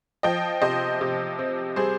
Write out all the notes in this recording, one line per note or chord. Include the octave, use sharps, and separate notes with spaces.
F3 D#5 G5
C3 C5 D#5
C3
C4
G3 G#4 C5